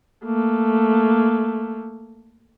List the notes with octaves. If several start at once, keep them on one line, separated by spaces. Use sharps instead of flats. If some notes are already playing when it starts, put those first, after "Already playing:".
A3 A#3